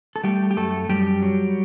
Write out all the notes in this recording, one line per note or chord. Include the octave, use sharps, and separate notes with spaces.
A4
G3 A3 G4
G4
F#2 A3 A4
F#2 G3 G4
F#3